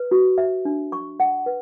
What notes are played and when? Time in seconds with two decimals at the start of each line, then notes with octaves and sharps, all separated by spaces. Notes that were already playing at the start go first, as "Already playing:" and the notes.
Already playing: B4
0.11 F#4
0.38 E5
0.65 D4
0.92 C#6
1.20 F#5
1.46 B4